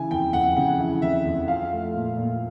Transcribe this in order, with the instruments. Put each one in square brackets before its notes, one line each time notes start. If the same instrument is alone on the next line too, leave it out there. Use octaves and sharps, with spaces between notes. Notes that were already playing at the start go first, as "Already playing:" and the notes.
Already playing: [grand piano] C#3 E3 G#5
F2 G5
F2 F#5
C#3 F#5
E3
F2 E5
F2
F3 F5
A3
A#2
A#2